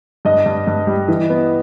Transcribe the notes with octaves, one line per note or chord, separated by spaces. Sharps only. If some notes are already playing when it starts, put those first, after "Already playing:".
G2 D#5
G2
G2
G3
E3
B3